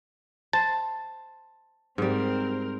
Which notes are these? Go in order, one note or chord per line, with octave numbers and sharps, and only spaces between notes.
C5 A5
G#2 G3 C4 A#4